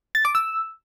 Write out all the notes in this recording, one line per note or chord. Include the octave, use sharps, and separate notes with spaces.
A6
D6
E6